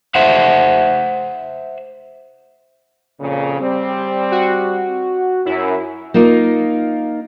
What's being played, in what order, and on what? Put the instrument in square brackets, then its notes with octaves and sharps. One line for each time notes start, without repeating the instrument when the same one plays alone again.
[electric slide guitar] C5 E5 F#5
[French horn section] F2 A#2 C#3
G3 C4
[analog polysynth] F#4
[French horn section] F#2 [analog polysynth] E4
[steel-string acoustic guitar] A#3 D#4 F4 A#4